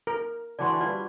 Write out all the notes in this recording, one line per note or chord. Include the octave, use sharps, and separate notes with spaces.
A#4
D3 E3 D4 F#4 D5 G5 A5 C6
G3 F4 B4 D5